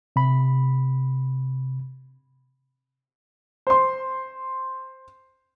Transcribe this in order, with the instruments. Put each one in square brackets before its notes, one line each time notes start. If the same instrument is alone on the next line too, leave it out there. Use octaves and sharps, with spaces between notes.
[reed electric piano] C3 B5
[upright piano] C5 C6